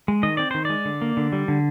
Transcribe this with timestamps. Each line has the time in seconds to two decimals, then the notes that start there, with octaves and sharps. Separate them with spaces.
0.08 G#3
0.23 D#3 D#5
0.37 C4 D5
0.51 D#3 C5
0.65 G#3 D5
0.85 D3
1.01 A#3
1.17 D3
1.32 G3
1.48 D3